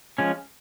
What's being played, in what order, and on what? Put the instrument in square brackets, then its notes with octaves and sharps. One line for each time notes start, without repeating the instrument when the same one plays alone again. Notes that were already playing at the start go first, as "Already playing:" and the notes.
[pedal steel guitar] F3 G#3 C#4